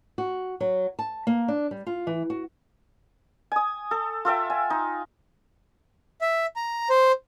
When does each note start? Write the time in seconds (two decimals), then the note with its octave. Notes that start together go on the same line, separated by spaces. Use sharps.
0.18 F#4
0.60 F#3
0.99 A5
1.27 A#3
1.48 D4
1.71 G3
1.87 F4
2.07 E3
2.30 F#4
3.52 G#5 D#6
3.91 A4
4.25 F4 A4 E5 G5
4.50 G#5
4.70 D#4
6.21 E5
6.56 A#5
6.90 C5